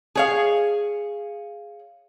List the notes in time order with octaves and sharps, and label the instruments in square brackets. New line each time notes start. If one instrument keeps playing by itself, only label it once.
[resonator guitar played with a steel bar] G#4 C#5 F5